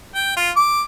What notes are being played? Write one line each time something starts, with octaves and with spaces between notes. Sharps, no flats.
G5
F4
D6